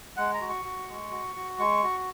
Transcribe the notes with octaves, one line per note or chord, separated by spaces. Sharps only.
G#3 F#5
A#5
F#4
C#6
F#4
G#3
F#4
F#4
G#3 C#6
F#4